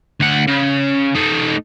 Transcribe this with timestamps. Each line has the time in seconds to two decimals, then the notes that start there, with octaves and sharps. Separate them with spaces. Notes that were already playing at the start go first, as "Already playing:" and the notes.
0.20 D2 F#5
0.47 C#3
1.15 A3 D#4